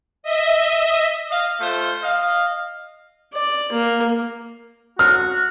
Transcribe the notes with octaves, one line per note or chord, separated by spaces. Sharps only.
D#5 E5
D#5 F5
A3 F4 C5
D#5 F5
D5
A#3
F#4 F6